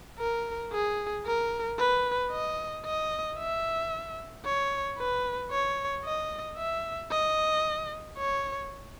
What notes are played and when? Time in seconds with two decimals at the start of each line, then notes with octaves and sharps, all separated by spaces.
0.18 A#4
0.72 G#4
1.26 A#4
1.78 B4
2.31 D#5
2.85 D#5
3.38 E5
4.45 C#5
4.98 B4
5.51 C#5
6.04 D#5
6.57 E5
7.11 D#5
8.18 C#5